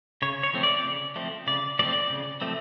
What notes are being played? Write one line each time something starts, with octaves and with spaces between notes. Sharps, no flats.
C#3 C#5
C#5
F3 A3 C4
D5
C#3
F3 A3 C4
C#3 D5
F3 A3 C4 D5
C#3
F3 A3 C4